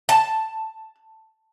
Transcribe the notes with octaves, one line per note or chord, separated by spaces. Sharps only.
A5